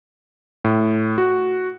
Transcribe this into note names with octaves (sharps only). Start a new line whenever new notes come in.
A2
F#4